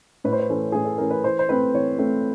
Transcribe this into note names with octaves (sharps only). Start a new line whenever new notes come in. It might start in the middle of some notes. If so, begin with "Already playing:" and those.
A2 B4
C5
B4
E3 A3 C#4
A2 G#4
A4
E3 A3 C#4 A#4
B4
E3 C5
C5
A3 C4 B4
E3 C#5
A3 C4